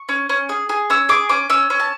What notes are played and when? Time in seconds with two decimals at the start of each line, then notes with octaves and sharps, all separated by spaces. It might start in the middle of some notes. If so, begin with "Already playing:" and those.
Already playing: C#6
0.09 C#4
0.29 C#4
0.49 G#4
0.69 G#4
0.90 C#4 E6
1.09 G#4 D6
1.29 C#4 D6
1.50 C#4 E6
1.70 C#4
1.80 A5